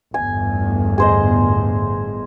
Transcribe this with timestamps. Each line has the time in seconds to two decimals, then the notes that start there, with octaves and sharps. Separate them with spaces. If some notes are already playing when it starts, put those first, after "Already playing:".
0.14 G1 E2 A2 G#5
0.98 G#4 C5 D#5